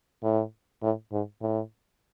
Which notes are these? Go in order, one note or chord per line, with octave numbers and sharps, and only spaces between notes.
A2
A2
G#2
A2